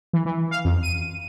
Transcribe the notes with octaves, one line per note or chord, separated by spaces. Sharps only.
E3
E3
F5
F2
D#7